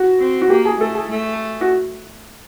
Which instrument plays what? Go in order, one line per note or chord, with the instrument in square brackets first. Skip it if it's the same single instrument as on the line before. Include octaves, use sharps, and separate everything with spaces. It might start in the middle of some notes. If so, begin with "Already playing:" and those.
Already playing: [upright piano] F#4
[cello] C4
[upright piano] F#4
[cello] A#3 [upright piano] G4
[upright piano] G#4
[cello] A3 [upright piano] A4
[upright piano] G#4
[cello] A3
[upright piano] F#4